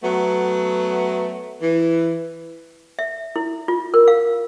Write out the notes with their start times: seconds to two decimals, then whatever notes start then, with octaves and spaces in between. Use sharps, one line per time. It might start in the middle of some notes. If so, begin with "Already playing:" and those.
0.03 F#3 A3 B3
1.62 E3
2.99 E5
3.36 E4
3.68 F4
3.94 A#4
4.08 F5